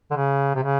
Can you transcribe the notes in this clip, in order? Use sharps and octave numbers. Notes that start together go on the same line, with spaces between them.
D3
C#3
C3
C#3